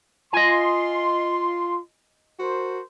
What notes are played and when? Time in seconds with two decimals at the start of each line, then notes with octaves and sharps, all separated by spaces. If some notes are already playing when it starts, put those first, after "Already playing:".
0.33 F4 D#5 G#5 C6
2.39 F#4 A#4 C5